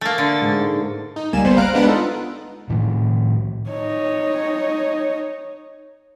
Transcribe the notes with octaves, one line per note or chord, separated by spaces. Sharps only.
A3 A#3 A6
D3
G#2
D#4
C#2 G3 A#3 G#5 E7
G1 G3 B3 C5
F5 A#5 F#6 D7
G#3 B3 D4 B4 F#5
D#4 F4 A4
A2 D#3 A3
D#4 C#5